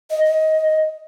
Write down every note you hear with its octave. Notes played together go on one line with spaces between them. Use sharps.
D#5
D#5